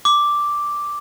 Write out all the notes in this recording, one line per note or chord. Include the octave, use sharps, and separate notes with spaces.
D6